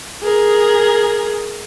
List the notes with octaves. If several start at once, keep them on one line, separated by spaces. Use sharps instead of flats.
G#4 A#4